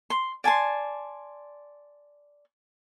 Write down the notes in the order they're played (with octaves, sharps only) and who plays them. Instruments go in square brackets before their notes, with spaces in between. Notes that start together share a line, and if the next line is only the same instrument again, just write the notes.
[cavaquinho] C6
D5 G#5 A5 C6